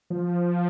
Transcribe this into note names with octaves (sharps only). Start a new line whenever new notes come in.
F3